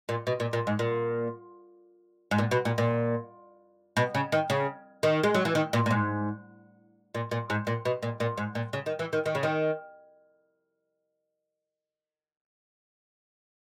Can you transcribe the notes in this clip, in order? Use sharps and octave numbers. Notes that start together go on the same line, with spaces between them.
A#2
B2
A#2
A#2
G#2
A#2
G#2
A#2
B2
A#2
A#2
B2
C#3
D#3
C#3
D#3
G#3
F#3
E3
D#3
A#2
A#2
G#2
A#2
A#2
G#2
A#2
B2
A#2
A#2
G#2
A#2
C#3
D#3
E3
D#3
D#3
C#3
D#3